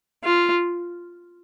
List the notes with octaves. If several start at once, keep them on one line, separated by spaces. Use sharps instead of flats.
F4